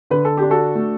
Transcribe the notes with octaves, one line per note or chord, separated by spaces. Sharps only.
D3 B4
A4
G4
D4
F#4 A4
A3